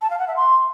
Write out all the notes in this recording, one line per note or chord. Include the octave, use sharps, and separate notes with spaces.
A5
F5
F#5
E5
C6